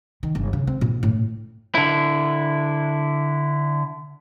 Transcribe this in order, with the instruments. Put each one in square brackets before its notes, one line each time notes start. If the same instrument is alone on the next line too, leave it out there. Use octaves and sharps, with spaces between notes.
[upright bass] D#3
G1
C#3
C4
A#2
A2
[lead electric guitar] D3 E4